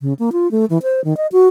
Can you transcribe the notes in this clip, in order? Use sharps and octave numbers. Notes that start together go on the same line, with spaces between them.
C#3
A#3
F4
A3
E3
C5
D#3
D#5
F#4